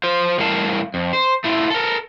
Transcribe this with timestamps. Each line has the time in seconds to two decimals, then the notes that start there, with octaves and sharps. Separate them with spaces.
0.04 F4 C5
0.38 A2 E3 G3 A#4 F5 A5
0.94 F2
1.13 C5
1.44 A3 E4 F4
1.70 A4 A#4